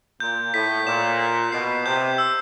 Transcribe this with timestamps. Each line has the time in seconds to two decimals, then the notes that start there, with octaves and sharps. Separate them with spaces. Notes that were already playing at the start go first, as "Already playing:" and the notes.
0.20 A#2 G6
0.54 A2 B6
0.86 A#2 E7
1.19 B6
1.52 B2 C7
1.86 C3 G6
2.18 E6